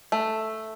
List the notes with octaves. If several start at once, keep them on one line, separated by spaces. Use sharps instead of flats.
A3